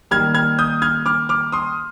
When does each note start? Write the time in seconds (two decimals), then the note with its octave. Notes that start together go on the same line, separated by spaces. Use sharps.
0.11 D#3 G3 A#3 F6 G#6
0.35 F6 G#6
0.59 D#6 G6
0.82 F6 G#6
1.06 D6 F6
1.29 D6 F6
1.52 C6 D#6